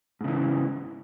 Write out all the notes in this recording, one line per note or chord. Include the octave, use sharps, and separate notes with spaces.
G#2 C#3 E3